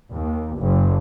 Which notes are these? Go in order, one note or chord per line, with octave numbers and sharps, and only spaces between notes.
D#2
F#1